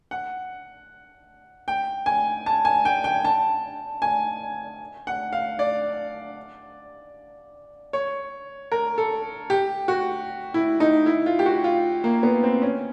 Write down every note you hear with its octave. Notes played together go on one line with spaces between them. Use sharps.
F#5
G5
G#5
A5
G#5
G5
G5
A5
G#5
F#5
F5
D5
C#5
A#4
A4
G4
F#4
E4
D#4
E4
F4
G4
F#4
F4
A#3
B3
C4
C#4